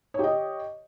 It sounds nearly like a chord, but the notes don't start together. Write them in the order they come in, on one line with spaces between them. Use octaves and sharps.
C#5 G4 D#5